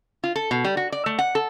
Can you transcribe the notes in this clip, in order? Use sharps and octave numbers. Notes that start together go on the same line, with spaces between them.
F4
A4
B2
G3
F#4
D5
A3
F#5
A4